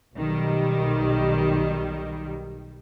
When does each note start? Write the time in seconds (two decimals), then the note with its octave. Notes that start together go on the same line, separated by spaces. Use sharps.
0.16 B1 D#3 G3